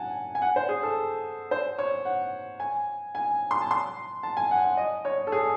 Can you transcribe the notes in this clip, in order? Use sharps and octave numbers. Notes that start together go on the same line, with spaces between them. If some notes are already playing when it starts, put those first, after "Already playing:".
Already playing: F#5 G#5 A5
G#5
F#5
C5
G#4
A4
C5
C#5
F#5
G#5
G#5
C6
A5
C6
A5
G#5
F#5
F#5
D#5
C#5
A4
G#4